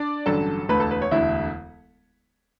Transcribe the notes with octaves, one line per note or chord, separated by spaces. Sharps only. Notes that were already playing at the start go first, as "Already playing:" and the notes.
Already playing: D4 D5
A1 G2 D3 F#3 C#4 A4 A5
E1 D2 D3 A3 B4 B5
A4 A5
B4
C#5
E1 D2 D3 A3 E4 E5